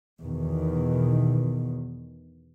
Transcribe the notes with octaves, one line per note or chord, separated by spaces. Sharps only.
E2 B2 D#3